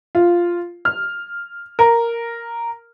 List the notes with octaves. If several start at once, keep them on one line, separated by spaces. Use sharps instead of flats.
F4
F6
A#4